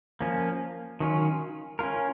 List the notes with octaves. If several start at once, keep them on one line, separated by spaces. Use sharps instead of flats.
F3 A#3 C#4
D#3 F#3 C#4 F4
C#4 F4 A#4